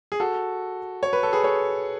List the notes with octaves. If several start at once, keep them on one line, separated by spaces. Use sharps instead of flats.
G#4
F#4 A4
C#5
B4
A4
G#4 B4
A4 C#5